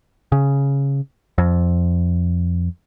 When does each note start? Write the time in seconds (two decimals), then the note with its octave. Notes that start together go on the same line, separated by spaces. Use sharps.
0.32 C#3
1.38 F2